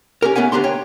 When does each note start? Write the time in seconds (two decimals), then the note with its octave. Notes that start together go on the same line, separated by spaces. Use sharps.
0.22 C#4 G4 A#4
0.35 A3 B3 C#4 F#5 G#5
0.52 D2 F#3 D4 G4 A#5 C6
0.64 C#5 G5